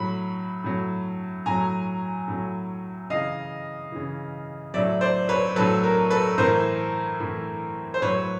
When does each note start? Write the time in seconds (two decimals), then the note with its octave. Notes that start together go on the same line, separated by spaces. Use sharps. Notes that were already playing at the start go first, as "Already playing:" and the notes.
Already playing: A2 F#3 B5
0.64 A2 F#3
1.46 A2 F#3 G#5 A#5
2.28 A2 F#3
3.10 C#3 E3 D#5 F5
3.92 C#3 E3
4.74 A2 F#3 D5 E5
5.01 C5 D5
5.29 B4 C#5
5.56 A2 F#3 A4 B4
5.83 A#4
6.10 A4 B4
6.38 A2 E3 A#4 C5
7.20 A2 E3
7.94 C5
8.02 A2 F#3 B4 C#5